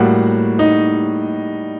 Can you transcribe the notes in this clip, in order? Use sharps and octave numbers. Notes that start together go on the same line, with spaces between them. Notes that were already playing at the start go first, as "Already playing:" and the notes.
Already playing: A2 G3 A#3 F#4 F#5
D#4 D#5